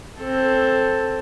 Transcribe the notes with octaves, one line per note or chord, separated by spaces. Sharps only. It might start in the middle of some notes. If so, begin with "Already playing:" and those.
C4 A4